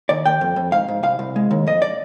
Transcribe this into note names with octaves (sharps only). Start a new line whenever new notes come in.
D#2 D5
D#2 G5
F2
F2
G#2 F5
G#2
C2 F5
C2
G#3
D#2
F2 D#5
D5